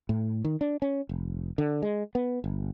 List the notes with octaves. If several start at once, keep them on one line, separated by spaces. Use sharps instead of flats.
A2
D#3
D4
C#4
F1
D3
G#3
B3
G1